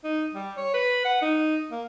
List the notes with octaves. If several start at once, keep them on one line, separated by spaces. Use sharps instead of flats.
D#4
G3
C#5
B4
F#5
D#4
A#3